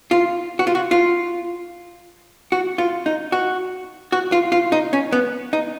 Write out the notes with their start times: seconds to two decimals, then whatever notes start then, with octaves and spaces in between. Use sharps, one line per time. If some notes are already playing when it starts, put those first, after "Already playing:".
0.11 F4
0.59 F#4
0.67 F4
0.75 F#4
0.91 F4
2.52 F#4
2.78 F4
3.06 D#4
3.32 F#4
4.12 F#4
4.32 F4
4.52 F4
4.72 D#4
4.93 C#4
5.12 B3
5.53 D#4